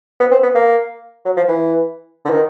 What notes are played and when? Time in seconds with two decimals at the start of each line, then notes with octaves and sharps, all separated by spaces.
0.20 B3
0.31 C4
0.43 B3
0.55 A#3
1.25 F#3
1.37 F3
1.49 E3
2.25 D3
2.30 D#3